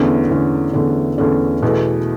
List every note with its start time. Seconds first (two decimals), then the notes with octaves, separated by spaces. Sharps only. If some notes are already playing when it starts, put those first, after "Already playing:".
Already playing: E2 D3 A3 C#4
0.29 E2 D3 A3 C#4
0.73 E2 D3 A3 C#4
1.18 E2 D3 A3 C#4
1.63 E2 B2 A3